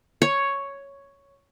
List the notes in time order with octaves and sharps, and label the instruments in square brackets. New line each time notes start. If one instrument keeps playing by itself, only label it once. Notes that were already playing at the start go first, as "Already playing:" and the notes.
[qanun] C#5